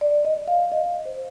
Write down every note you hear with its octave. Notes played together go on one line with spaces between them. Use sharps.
D5
D#5
F5
D#5
C5